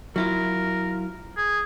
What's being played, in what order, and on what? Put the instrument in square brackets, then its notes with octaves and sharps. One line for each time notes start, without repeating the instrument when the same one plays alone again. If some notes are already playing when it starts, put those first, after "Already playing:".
[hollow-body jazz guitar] F#3 E4 F4 [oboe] A#4
[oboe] G#4